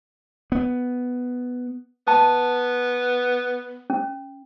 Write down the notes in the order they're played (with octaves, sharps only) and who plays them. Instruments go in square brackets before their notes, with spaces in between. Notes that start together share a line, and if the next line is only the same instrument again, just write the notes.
[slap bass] B3
[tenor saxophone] B3 [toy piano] A5
[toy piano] C#4